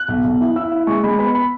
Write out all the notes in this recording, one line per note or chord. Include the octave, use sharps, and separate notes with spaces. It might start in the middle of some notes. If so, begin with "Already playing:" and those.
Already playing: F#6
B1
B1
E4
E4 E6
E4
G#3 C#6
G#3 B5
B3 B5
B5